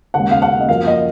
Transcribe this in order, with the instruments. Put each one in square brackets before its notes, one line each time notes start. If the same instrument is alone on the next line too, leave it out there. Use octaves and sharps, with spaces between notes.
[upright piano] D#2 C#3 G#3 F#5
F5
F#5
D#5
F#2 F3 A#3 F5
D#5